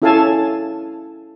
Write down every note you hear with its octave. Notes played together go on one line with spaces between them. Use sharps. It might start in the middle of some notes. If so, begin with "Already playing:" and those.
C#4 E4 A4 F5 G#5 A5